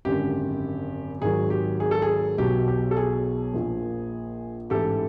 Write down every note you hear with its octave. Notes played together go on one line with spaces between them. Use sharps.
G#1 F#2 D3 G4
G#1 G#2 D#3 F#3 G#4
G4
G#4
A4
G#4
B1 B2 F#3 G4
G4
A4
G#4
A#1 A#2 F3
A1 G#2 E3 G4 A4